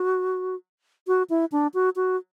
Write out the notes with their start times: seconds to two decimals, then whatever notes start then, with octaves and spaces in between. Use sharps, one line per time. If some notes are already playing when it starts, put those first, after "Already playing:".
Already playing: F#4
1.07 F#4
1.30 E4
1.52 D4
1.74 F#4
1.96 F#4